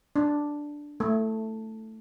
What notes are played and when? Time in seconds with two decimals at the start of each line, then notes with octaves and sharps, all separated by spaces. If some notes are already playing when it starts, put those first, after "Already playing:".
0.16 D4
1.00 A3